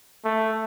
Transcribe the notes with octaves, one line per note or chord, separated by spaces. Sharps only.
A3